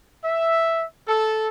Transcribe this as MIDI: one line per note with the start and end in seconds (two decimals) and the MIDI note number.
0.25 0.84 76
1.08 1.48 69